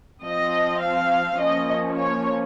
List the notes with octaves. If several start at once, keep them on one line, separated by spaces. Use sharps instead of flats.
F3 C4 D#5
F5
F3 A#3 C#4 D#5
C#5